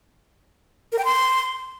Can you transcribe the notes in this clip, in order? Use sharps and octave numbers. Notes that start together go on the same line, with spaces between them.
A#4
G5
C6